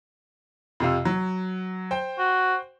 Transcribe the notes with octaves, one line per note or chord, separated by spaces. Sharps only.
F2 C3 F5
F#3
C5 G5
F#4